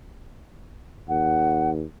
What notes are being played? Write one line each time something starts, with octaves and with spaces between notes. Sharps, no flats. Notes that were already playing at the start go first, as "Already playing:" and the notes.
D#2 F#5